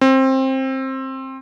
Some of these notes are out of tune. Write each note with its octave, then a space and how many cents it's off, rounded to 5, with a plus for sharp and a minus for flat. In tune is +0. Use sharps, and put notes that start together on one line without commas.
C4 +20